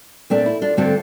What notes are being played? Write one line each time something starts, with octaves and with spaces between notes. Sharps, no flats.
A#2 A3 C4 D4
E4
D4 F4
G2 D3 A3 C4 F4 A4